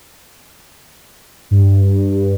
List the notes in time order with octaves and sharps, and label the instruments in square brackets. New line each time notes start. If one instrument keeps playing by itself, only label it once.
[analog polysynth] G2